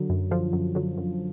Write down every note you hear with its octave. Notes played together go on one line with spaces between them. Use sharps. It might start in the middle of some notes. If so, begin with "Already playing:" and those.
Already playing: D3 F#3
F#2
D3 F3
F#2
D3 F#3
F#2